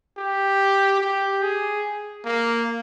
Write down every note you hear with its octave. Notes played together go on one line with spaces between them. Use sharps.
G4
G4
G#4
A#3